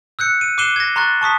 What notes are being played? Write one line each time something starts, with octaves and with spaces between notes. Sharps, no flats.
E6 F#6 G6 C#7
D#7
D6 F#6 C7 D#7 E7 G7
G#6 A#6
A#5 C6 C#6 F#6 A6
A5 C#6 D#6 B6